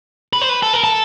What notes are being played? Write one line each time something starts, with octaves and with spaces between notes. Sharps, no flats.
B4
C5
B4
A4
A#4
A4